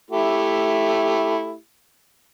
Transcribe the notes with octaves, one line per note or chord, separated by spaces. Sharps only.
A3 E4 G4